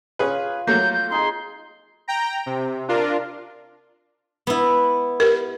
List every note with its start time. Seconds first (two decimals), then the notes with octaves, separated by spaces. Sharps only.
0.19 C#4 F4 G#4 B4
0.67 F#3 A3 A#3 G6
0.93 G6
1.10 C4 D#4 G#4 C6
2.08 G5 A#5
2.46 C3
2.88 D4 F4 A#4
4.47 B3 E4
5.20 G4 A#4